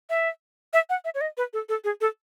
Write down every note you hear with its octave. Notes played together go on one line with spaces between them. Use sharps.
E5
E5
F#5
E5
C#5
D#5
B4
A4
A4
G#4
A4